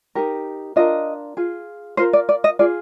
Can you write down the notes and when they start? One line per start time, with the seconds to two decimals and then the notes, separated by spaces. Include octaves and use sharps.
0.15 D#4 G4 A#4
0.76 D4 F4 A#4 D#5
1.37 F4 G#4
1.97 F4 A#4 C5
2.13 D5
2.29 D5
2.44 D#5
2.59 F4 G#4 D5